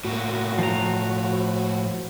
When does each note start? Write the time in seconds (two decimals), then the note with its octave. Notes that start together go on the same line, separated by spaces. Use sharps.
0.04 A2 A#3 F#4
0.59 F3 A#5